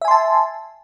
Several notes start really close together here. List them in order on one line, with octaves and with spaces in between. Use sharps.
E5 G#5 C6 A5